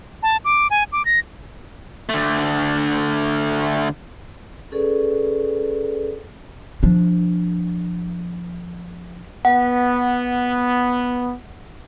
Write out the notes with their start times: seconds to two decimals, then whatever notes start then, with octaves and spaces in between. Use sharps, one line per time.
0.23 A5
0.45 D6
0.70 G#5
0.92 D6
1.05 A#6
2.09 D3 A3
4.71 C#4 G#4 A4 B4 D5
6.83 F3 D4
9.45 B3 F#5